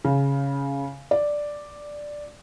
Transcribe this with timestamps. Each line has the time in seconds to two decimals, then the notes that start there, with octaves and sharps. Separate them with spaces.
0.05 C#3
1.11 D5